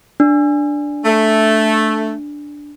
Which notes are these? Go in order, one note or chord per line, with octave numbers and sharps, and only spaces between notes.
D4
A3